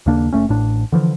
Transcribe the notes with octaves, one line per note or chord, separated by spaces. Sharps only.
D#2 C#3 A#3 D4
F#1 G#2 A3 C#4
A1 A2 D4
D3 E3 F3